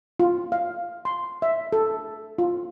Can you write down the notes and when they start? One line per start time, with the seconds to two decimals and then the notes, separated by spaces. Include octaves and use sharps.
0.20 F4
0.52 F5
1.05 C6
1.42 E5
1.72 A4
2.38 F4